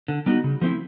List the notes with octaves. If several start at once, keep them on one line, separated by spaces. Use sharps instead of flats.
D3
G3 B3 D#4 F#4
C#3
F3 A3 C4 E4